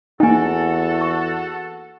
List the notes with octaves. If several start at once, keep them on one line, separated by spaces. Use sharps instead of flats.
E2 A#3 D#4 F#4 A4 G5 G#5
C#6